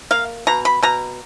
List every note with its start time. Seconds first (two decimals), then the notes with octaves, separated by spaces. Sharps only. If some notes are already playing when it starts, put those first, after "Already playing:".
0.11 A#3 F5
0.47 B2 A#5
0.65 B5
0.82 B2 A#5